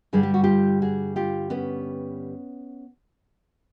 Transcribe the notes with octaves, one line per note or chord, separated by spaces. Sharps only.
G2 D3 G3 G#4
G4
F#4
F4 G4
F#4 G#4
F4 G4
B3 C#4